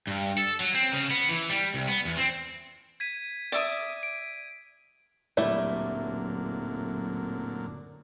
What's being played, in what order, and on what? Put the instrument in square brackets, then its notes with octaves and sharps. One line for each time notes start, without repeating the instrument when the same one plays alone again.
[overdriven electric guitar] G2
A4
F#3
C4
C#3
B3
E3
G3
C2
B3
E2
C4
[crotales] G#6 B6 D#7
[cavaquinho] D5 E5 D#6 [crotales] D7
[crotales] D7
[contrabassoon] D1 [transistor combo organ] F#2 A#2 D3 [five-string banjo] G3 A3 E4